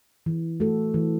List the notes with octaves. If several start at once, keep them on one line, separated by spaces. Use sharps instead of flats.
E3
A3 F#4 A4
E3